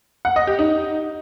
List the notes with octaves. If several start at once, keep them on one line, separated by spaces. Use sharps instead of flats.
F#5
D#5
G4
D#4